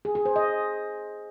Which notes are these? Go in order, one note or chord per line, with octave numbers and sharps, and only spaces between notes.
G#4
G#4
C5
D#5